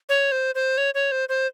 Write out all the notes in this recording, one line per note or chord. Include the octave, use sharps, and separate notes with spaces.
C#5
C5
C5
C#5
C#5
C5
C5